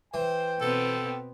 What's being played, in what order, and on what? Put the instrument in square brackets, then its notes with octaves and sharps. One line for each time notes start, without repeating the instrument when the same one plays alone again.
[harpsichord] E3 [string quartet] C5 [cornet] G5
[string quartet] B2 B3 C4 [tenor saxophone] A4